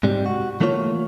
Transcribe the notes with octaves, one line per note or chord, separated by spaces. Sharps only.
G#2 C3 G3
F#4
E3 A3 A#3 F4 C#5